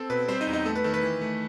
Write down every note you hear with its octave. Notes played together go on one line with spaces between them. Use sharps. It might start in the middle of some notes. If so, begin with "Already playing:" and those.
Already playing: C4 A4
B2 B4
G3 C4 C5
D#4 D#5
E2
D#4 D#5
A3 A4
B4
D#3 A4
B4
E3
A3